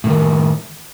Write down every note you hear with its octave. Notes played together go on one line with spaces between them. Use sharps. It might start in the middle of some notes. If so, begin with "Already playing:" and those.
A2 C3 D#3